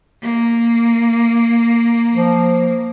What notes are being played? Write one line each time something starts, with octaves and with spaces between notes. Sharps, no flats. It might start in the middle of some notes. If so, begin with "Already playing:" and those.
A#3
F3